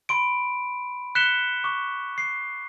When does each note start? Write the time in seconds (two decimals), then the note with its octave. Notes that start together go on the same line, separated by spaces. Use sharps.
0.09 B5 C6 D7
1.15 F#6 B6 C#7 E7 G7
1.64 C#6 D6
2.18 C7